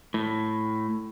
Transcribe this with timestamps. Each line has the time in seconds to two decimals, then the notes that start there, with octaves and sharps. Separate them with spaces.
0.14 A2